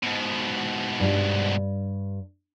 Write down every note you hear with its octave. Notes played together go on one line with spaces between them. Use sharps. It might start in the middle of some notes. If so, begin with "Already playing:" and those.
G#2 B2
G2 G3